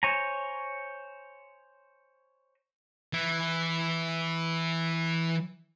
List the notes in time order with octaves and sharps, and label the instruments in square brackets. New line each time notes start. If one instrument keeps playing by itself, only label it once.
[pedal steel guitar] C5 C#5 G#5 A#5
[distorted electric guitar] E3 E4